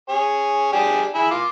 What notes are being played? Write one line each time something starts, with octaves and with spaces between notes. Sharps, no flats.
G#4 C#5
D4 G4 G#4
E4 G#4
F4 D6